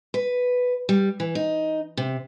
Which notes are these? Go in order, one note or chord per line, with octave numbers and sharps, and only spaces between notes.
B4
G3
E3
D#4
C3